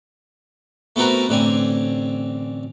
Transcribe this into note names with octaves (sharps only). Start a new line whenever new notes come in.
A3 B3 C4 F#4 A#4 B4
A1 D3 C4 G#5